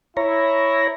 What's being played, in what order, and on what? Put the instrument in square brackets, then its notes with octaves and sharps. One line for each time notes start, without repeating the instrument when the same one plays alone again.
[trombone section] E4 [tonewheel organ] C#5 A#5